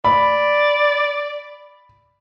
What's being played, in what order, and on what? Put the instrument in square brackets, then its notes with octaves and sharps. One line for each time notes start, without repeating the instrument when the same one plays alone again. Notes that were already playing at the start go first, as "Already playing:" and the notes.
[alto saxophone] D5 [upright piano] B5